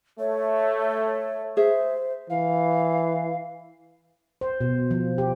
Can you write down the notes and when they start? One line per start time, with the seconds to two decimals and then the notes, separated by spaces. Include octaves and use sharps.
0.19 A3 C#5
1.57 G#4 C5 E5
2.30 E3 F5
4.41 C5
4.61 B2
4.91 F3
5.18 G4